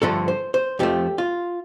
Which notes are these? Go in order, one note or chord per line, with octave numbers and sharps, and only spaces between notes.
G2 D3 F3 A3 A4
C5
C5
F2 F3 A3 G4
F4